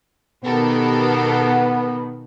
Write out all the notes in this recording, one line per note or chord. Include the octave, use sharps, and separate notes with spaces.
B2 D#3 B3 G4 A4 A#4